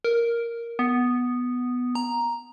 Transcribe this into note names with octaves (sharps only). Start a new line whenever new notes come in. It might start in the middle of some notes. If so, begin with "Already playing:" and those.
A#4
B3
A#5